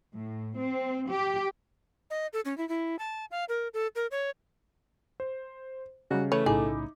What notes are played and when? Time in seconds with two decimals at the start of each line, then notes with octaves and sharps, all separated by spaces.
0.15 A2
0.58 C4
1.11 G4
2.10 D#5
2.33 A4
2.45 C#4
2.58 E4
2.69 E4
2.99 A5
3.31 F5
3.49 A#4
3.74 A4
3.95 A#4
4.11 C#5
5.20 C5
6.11 C#3 G3 D#4 F#4
6.32 E3 A3 B4 C#5
6.46 B1 A2 C#3 D#4 E4 G#4 D6